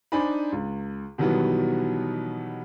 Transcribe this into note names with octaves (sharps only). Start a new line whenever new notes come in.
D4 D#4 C5 G#5 B5
C#2
B2 D#3 E3 F#3 G3 B3